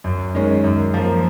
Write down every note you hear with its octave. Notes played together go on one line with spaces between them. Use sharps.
F#2
D#3 G#3 C#4
F#2
F3 A#3